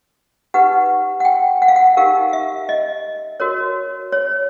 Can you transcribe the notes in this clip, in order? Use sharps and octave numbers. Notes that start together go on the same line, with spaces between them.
D#4 G4 B4 F#5
F#5
G5
F#5
F5
F#5
D#4 G4 A#4 F5
E5
D#5
F#4 A#4 C#5
C#5